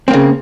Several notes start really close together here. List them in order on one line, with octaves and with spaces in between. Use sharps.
C4 A#3 C#3